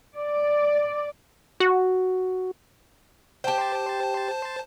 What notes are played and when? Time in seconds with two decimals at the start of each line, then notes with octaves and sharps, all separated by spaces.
0.16 D5
1.60 F#4
3.44 G4 C5 G5 A5